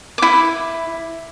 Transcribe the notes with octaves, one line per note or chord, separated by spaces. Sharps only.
E4 D6